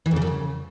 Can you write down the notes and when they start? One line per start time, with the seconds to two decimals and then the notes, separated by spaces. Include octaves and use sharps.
0.06 E3
0.11 F2
0.16 C#3
0.22 F#2
0.27 C#3